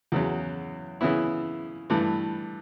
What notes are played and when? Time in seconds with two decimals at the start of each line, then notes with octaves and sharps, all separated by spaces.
0.12 E2 C#3 F#3
1.01 C#3 E3 B3 E4
1.90 G2 E3 A3